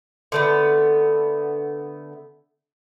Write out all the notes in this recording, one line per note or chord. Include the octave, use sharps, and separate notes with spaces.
D3 A3 B3